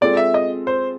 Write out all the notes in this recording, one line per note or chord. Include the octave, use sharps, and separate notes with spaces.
G#3 C4 F4 A4 D5
E5
D#5
C5